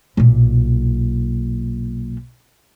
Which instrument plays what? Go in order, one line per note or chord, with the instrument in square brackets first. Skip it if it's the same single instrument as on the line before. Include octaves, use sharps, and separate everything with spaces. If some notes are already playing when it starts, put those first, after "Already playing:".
[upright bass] B1 A#2